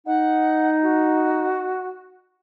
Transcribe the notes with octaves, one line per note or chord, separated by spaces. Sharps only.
D#4 F#5
F#4